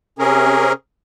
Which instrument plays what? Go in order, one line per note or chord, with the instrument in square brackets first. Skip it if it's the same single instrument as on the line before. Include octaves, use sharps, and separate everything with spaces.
[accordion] C3 C#4 G#4 A#4